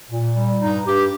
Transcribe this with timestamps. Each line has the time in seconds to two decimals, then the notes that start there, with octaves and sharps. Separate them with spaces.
0.10 A#2
0.36 G3
0.61 G2 D#4
0.85 G2 G4